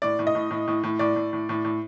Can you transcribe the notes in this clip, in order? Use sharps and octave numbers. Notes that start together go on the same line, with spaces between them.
A2 D5
A2
D#5
A2
A2
A2
A2
A2 D5
A2
A2
A2
A2